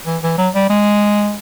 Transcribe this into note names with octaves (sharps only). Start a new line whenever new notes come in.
E3
E3
F#3
G3
G#3